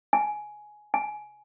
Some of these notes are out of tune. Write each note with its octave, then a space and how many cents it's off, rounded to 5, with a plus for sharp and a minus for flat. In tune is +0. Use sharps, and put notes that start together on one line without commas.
G#5 +15
G#5 +20